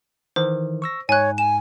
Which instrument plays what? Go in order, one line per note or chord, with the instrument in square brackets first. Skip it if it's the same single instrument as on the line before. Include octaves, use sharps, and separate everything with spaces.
[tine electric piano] D#3 E3 [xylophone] C5
[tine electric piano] C#6 E6 A#6
[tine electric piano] G#2 [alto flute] C#5 [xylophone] G#5 F#6
[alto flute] G#5 [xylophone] E7